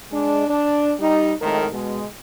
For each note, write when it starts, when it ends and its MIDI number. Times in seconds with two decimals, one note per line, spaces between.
0.12 0.45 56
0.12 0.45 62
0.47 0.92 62
1.00 1.33 55
1.00 1.33 63
1.42 1.66 41
1.42 1.66 45
1.42 1.66 51
1.42 1.66 56
1.42 1.66 70
1.72 2.04 47
1.72 2.04 56